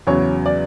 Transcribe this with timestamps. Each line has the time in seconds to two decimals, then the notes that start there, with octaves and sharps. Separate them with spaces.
0.07 E2 C#3 F#3 C#5
0.46 D5